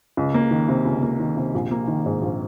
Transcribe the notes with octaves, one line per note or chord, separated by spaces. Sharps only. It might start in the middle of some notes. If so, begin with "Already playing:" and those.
C#2
A#3
D#3
C3
C#2
A#3
D#3
C3
A#1
A#3
D#3
G#2
A#1